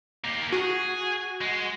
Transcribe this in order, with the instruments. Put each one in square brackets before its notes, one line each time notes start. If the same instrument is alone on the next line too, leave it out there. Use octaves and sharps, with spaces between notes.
[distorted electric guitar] A#3 G4
[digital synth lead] F#4 [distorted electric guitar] G#4
[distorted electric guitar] G#3